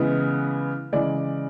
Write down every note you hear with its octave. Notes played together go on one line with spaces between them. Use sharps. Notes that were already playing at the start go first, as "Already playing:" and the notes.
Already playing: C#3 E3 G#3 B3
C#3 E3 G#3 D5